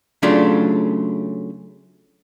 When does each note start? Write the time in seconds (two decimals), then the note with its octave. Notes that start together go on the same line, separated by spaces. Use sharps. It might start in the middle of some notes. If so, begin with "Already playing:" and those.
0.22 C#3 F#3 A3 D4 F4